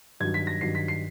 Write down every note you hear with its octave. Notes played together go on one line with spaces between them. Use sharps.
G2 D#3 F#3 G#6
B6
A#6
G2 D#3 F#3 C7
B6
C7